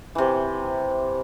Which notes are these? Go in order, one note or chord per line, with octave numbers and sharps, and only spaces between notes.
C3 E3